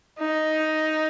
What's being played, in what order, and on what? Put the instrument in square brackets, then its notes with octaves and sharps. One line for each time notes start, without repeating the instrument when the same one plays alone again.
[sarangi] D#4